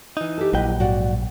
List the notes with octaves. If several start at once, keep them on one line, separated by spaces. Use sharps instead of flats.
E3 D#4
G4 A4
A#1 F#3 E4 B4 D#5 G5
G#2 F#4 D5 F#5